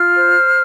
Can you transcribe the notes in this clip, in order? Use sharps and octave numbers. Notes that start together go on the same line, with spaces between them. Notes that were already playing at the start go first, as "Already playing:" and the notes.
Already playing: F4 F6
C5